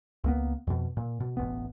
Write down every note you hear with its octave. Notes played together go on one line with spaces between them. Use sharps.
C#2 A#3 B3
F2 B2
A#2
B2
E1 A1 B3